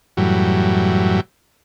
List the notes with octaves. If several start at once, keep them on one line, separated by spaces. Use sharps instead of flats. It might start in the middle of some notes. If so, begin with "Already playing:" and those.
F#2 A2 E3 F#3 G3